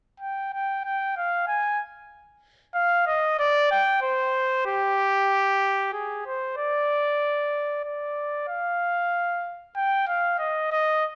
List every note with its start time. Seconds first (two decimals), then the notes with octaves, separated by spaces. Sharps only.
0.20 G5
0.53 G5
0.85 G5
1.17 F5
1.48 G#5
2.75 F5
3.07 D#5
3.39 D5
3.72 G5
4.02 C5
4.66 G4
5.93 G#4
6.26 C5
6.57 D5
7.85 D5
8.48 F5
9.76 G5
10.08 F5
10.39 D#5
10.72 D#5